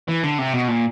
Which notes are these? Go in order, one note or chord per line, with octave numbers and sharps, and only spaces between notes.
E3
D3
C3
B2
A#2